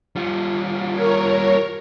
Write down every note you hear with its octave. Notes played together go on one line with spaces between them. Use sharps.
G3 F4
A#4 C#5